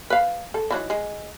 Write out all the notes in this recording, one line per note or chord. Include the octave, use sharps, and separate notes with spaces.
B4 F5
A4
E3 F#3 D#4
G#3